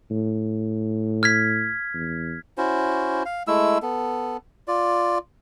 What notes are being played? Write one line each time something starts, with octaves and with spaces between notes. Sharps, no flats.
A2
F6 G#6 B6
E2
C#4 E4 F#4 C5
F5
G#3 A3 E4 E6
B3 A4
F4 D5